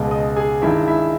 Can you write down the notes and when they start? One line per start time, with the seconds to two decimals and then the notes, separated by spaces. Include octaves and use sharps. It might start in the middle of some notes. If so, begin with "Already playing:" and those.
Already playing: C#2 B2 G#3
0.11 D#5 D#6
0.36 G#4 G#5
0.62 G2 D#3 G#3 E4 E5
0.87 E4 E5